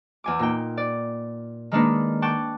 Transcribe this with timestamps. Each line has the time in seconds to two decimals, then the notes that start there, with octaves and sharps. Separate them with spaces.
0.24 E2 G#5 D6
0.39 A#2 D#4 G5
0.77 D5
1.72 D#3 G#3 A#3 D4 D#4 B4
2.22 G5 A5 C#6 D6 F#6